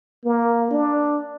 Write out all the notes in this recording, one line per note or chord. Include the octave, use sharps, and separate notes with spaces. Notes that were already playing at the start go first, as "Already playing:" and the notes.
A#3
D4